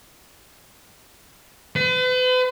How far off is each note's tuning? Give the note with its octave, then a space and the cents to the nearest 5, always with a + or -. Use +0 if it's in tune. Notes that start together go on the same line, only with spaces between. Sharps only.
B4 +40